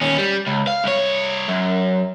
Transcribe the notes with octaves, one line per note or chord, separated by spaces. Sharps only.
D#2 C#4
G3
C#2
F5
C2 C#5
F#2